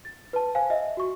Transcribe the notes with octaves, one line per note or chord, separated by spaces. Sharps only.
A6
B4 A5
C5 F5 G#5
D#5 E5
F#4 C#6